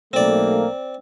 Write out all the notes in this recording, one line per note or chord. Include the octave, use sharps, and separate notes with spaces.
B1 A3 A#3 C4 D5